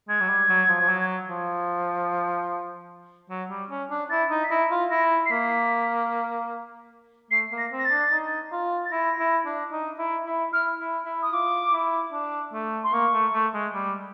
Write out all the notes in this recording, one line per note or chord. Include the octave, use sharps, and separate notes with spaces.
G#3 G#6
F#3
G3
F#3
F3
F3
F#3
F3
F#3
G3
C#4
D4
E4 A6
D#4
B6
E4 A#6
F4
E4 A#6
C7
A#3 B6
A3 C7
A#3
A#6
C4
A#6
A6
D4
D#4
F4
A6
E4 A#6
E4
D4
D#4
E4
E4
E4 F6
E4
E4
D#6
F4 D6
E4
D4
A3
C6
A#3 C#6
A3
A3
G#3
G3